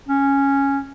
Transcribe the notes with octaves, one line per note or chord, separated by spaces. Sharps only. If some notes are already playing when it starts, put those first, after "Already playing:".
C#4